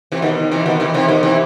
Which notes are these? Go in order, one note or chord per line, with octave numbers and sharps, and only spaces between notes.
C3 E3
B2 D#3
C3 E3
B2 D#3
C3 E3
C3 E3
B2 D#3
C3 E3